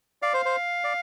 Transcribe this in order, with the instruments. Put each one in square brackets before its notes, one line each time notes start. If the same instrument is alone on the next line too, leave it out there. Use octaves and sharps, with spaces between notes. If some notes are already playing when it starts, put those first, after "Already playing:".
[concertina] D5 [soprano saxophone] F5
[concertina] C5
C5
D5